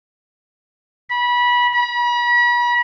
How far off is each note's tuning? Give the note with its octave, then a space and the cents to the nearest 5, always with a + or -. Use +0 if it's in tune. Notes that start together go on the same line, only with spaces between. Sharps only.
B5 -25
B5 -40